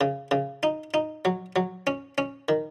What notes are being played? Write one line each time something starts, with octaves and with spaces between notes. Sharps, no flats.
C#3
C#3
D#4
D#4
F#3
F#3
C#4
C#4
D#3